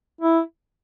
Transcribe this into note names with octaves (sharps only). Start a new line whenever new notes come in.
E4